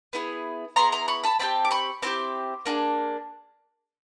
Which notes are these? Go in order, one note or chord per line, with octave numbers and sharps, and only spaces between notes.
B3 E4 G#4
B3 E4 G#4 A#5 C6
A#5 C6
B5 C#6
A5 B5
C4 E4 G4 A5 B5
D6
B5 C#6
C4 E4 G4 C6 D6
A#3 D4 F4 G#4